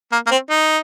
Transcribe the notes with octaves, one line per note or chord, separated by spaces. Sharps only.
A#3
A#3
C4
D#4